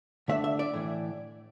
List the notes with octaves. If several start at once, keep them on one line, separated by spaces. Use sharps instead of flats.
D3 A3 D4 E5
E5
D5
A2 E3